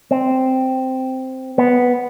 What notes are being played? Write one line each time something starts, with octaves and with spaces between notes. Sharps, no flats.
C4
B3